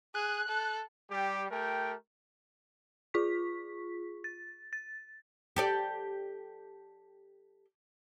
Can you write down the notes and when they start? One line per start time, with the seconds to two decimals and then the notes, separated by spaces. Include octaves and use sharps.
0.15 G#4 F#6
0.49 A4
1.11 G3 G4
1.51 A3 G4 A#4 G5
3.14 F4 G#4 C#6 B6
4.24 A6
4.73 A6
5.56 G4 A4 D5